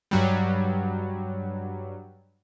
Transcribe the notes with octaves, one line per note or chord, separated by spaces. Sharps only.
G2 F#3 G3